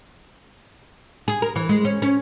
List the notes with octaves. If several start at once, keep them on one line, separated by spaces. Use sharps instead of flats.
G#4
A#4
E3
G#3
C#4
C#4